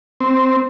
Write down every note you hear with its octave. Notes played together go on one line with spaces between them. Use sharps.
C4